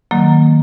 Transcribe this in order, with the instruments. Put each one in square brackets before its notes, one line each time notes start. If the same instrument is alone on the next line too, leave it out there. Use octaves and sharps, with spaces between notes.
[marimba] D#3 F#3 A#3